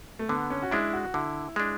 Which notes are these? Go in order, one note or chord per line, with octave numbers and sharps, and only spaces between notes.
A3
D3 B3
C#4
F#4
G#3 D4 E4
F#4
D3 E4
G#3 D4